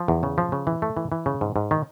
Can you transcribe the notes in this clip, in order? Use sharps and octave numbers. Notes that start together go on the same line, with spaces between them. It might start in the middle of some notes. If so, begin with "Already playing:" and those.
Already playing: F3
E2
C#3
F3
C#3
E3
A3
E3
E3
C#3
G#2
G#2
D#3